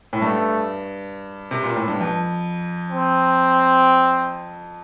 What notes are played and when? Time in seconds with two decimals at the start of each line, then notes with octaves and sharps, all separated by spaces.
0.13 A2
0.21 G2 A3
1.51 C3
1.64 A#2
1.76 A2
1.88 G2
2.01 F2
2.90 C4